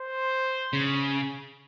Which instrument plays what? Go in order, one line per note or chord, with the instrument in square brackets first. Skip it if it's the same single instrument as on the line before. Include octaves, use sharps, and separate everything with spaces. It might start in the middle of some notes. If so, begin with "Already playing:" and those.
Already playing: [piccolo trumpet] C5
[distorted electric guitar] C#3